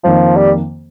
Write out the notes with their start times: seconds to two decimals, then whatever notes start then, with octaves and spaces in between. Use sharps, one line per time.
0.04 F2 D#3 F3 A#3
0.37 G3